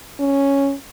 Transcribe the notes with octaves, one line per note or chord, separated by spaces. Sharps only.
C#4